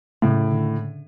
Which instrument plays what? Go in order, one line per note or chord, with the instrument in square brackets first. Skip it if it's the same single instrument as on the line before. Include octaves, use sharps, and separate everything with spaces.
[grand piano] A2 [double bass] C#3
[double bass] D3